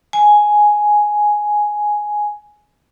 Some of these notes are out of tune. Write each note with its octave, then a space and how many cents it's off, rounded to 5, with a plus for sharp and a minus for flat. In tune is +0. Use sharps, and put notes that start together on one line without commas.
G#5 +5